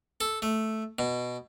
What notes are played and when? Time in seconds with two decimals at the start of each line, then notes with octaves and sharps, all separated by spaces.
0.21 A4
0.42 A3
0.99 B2